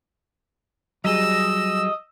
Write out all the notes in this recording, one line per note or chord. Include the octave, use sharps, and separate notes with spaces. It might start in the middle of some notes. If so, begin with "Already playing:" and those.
F#3 G3 G#4 D#5 E6